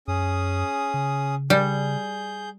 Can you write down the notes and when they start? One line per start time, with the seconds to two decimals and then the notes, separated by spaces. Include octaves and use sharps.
0.08 F#2 C#4 G#4 D#6
0.94 C#3
1.50 G3 G#4 G6